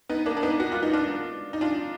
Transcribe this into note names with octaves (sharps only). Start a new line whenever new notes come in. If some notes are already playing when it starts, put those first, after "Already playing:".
B3 D#4
A#3 D4
D4
B3 D#4
F#4
F4
D#4
D4 F4
D#4
D4 F4